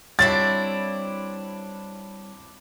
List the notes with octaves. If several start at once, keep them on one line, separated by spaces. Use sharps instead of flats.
G3 C4 D4 E4 C#5 A6